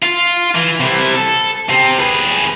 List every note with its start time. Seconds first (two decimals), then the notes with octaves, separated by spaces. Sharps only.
0.02 F4
0.55 E3
0.80 C3 E4
1.15 A4
1.69 C3 C4
1.99 G#4 B4